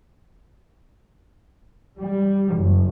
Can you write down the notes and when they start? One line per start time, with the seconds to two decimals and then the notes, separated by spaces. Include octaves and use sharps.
1.98 G3
2.56 F#1